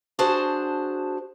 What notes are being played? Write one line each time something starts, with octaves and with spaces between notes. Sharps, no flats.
D4 F#4 G#4 C5 A5